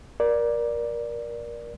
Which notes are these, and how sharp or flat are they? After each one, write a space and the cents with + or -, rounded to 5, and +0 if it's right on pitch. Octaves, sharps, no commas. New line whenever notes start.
A#4 +25 D5 +0